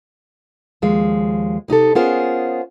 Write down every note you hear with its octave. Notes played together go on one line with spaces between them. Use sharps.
D#2 F3 G#3 F5
C3 D#4 G4 A4
B3 C#4 F4 G#4 A#4 C5